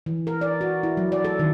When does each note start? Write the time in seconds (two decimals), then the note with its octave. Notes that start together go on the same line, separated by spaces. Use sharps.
0.06 E3
0.27 A#4
0.41 D5
0.61 F#4
0.83 E4
0.97 F#3
1.12 D5
1.25 A4
1.39 D#3